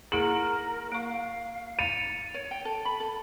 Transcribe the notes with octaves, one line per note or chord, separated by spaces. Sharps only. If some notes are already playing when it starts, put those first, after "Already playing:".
A#3 E4 G#4 A#4 F#7
A#3 F5 C#6
A6 C#7 D#7 F7
C#5
G5
A4
B5
A4